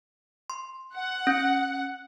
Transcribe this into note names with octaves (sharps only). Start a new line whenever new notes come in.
C6
F#5
C#4